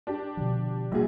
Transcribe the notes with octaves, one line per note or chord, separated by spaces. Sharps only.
D4 G4
B2 D3 F3
A#1 F#3 G3 A#3 G#4